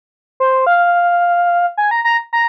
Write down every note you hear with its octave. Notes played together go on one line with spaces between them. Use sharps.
C5
F5
G#5
A#5
A#5
A#5